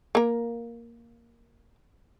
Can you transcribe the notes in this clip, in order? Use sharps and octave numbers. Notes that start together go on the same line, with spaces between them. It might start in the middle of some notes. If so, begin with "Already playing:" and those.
A#3 A#4